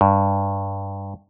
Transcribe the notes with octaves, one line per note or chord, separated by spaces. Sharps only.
G2